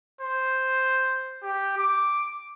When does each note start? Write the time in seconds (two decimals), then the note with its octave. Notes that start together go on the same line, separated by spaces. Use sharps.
0.21 C5
1.43 G4
1.78 D6